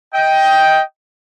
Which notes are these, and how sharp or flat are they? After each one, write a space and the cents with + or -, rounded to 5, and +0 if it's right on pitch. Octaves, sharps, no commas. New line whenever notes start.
D#5 +20 G5 +0